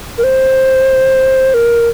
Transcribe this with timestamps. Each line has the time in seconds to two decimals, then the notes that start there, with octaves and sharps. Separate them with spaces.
0.18 A#4
0.24 C5
1.54 A#4